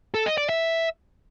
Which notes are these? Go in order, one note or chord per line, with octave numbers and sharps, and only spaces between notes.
A4
D#5
D5
E5